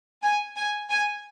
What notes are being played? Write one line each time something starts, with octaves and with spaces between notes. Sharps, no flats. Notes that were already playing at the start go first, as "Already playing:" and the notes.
G#5
G#5
G#5